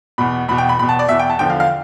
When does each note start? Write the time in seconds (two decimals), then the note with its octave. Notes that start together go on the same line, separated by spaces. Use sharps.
0.18 E2 B2 B5
0.48 E2 B2 B5
0.58 G5
0.69 B5
0.79 E2 B2 B5
0.89 A5
0.99 D5
1.09 E2 B2 E5
1.19 G5
1.29 A5
1.39 E2 D3 F3 G5
1.50 F5
1.60 F5